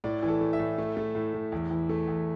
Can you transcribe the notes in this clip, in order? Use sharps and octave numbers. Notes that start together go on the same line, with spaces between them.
A2 D5
E3
A4
A3
E5
A2
A3
A3
A2
A2
E2
E3
A3
E2